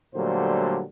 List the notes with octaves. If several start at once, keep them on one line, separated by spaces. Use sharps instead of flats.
A#2 D3 F#3 G3 A3 C5